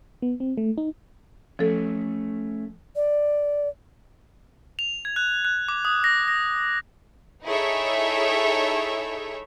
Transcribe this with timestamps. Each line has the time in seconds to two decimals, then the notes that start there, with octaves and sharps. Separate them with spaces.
0.22 B3
0.40 C4
0.58 A3
0.78 D#4
1.59 F3 A3 C#4 A4
2.96 D5
4.79 F7
5.05 G#6
5.16 F#6
5.45 F#6
5.68 D6
5.85 D#6
6.04 A#6
6.28 A#6
7.45 D#4 E4 G#4 A4 C#5 E5